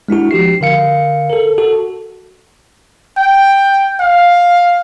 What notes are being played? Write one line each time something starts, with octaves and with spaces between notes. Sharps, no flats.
G#3 D4 E4 F#4
F3 G4 C7
D3 A#4 F5 C#7
A4 A#4
F#4 A4
G5
F5